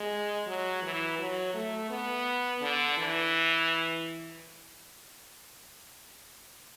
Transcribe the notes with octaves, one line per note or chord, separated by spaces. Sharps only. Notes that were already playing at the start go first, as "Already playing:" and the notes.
Already playing: G#3
F#3
E3
F#3
A3
B3
D3
E3